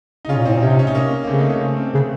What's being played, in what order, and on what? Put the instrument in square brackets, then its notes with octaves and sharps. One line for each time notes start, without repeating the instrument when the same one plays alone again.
[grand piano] D#4
[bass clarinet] C#3 [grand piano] C#4 F4
[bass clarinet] A#2
[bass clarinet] A2 [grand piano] C4 D#4
[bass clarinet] A#2
[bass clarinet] C3 [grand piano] C#4
[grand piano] D#4
C#4
D#4
A#3 C#4
A#3
[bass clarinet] C#3 [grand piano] A3 C4
[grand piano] C4 D#4
A#3 C#4
A3 C4
C4
A#3
[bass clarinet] C#3
[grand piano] A3